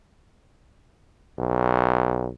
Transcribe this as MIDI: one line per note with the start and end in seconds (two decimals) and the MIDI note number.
1.38 2.30 35